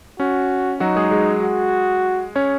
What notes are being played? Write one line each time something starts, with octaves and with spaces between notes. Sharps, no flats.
C#4 F#4
F#3 D#4 F#4
G#3 G#4
G#3 G#4
F#4
C#4 C#5